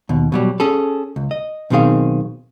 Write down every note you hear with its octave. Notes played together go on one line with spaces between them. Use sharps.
D#2 B2
B2 F#3 G3
C#4 G#4 A4
C#2
D#5
B1 B2 D#3 C4 G#4 F5